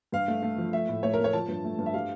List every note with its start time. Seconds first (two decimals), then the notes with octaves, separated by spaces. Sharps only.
0.12 G2 F5
0.28 A3
0.43 A3
0.58 F3
0.73 A3 E5
0.89 A2
1.03 A3 C#5
1.14 A#4
1.19 A3
1.24 C#5
1.33 F3 A5
1.48 G2
1.64 A3
1.79 G2
1.86 E5
1.94 G3 F5